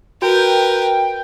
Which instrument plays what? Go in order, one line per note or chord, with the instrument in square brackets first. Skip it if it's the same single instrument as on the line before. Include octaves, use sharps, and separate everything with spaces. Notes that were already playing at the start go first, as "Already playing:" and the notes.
[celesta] F#4 [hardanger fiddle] A#4 B4 [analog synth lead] G5